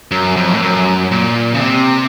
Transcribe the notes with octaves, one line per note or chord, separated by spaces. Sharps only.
F#2
F2
A2
F#2
A#2
C#3
C3